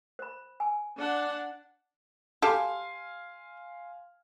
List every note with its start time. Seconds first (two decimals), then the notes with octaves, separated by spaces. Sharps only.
0.19 C5 B5
0.60 G#5
0.97 D4 F#5
2.42 G4 A4 F5 G#5 C6